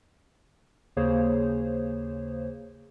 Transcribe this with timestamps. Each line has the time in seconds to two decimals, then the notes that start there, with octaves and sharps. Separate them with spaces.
0.97 D#2 C#3 A#3 G#4 C5 C#5